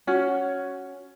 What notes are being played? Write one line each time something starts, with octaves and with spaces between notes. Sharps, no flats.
C#4 F#4